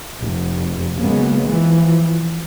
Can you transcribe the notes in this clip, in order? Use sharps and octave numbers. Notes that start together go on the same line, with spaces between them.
F1
C#3 F#3 G#3 A#3 B3
E3 F3